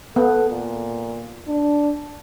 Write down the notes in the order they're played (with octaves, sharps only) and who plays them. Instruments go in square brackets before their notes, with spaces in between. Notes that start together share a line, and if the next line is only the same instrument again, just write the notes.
[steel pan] B3 [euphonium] A4
[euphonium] A#2
D4